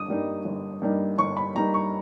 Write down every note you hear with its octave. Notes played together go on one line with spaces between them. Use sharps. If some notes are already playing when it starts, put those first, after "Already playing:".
Already playing: G1 D#6
G2 G3 A#3 D#4
G1
G2 G3 A#3 D#4
G1 C#6
B5
G2 G3 A#3 D#4 A#5
C#6